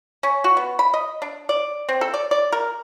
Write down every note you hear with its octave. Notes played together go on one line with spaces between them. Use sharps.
C#4
F#4
B3
B5
D#5
D4
D5
C4
A4
D5
D5
A#4